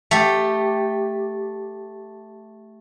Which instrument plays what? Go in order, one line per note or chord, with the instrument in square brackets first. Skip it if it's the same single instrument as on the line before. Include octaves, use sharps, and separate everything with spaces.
[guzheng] A3 G4